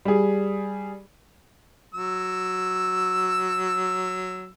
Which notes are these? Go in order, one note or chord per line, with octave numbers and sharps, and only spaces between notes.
G3 G#4
F#3 E6